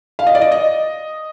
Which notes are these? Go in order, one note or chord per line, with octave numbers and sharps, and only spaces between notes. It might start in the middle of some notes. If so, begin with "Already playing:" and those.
F5
D#5
D5
D#5
D#5